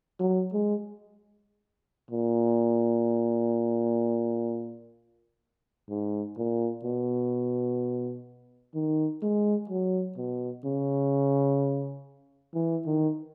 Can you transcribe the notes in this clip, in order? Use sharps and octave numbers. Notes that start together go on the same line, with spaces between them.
F#3
G#3
A#2
G#2
A#2
B2
D#3
G#3
F#3
B2
C#3
E3
D#3